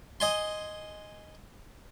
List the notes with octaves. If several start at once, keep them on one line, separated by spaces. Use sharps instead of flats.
D#5 G#5 C6